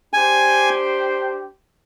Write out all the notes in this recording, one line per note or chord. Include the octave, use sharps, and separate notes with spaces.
D4 G4 C5 G5 G#5